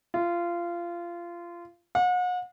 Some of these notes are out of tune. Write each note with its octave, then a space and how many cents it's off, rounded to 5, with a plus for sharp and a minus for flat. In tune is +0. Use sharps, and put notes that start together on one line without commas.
F4 -20
F#5 -40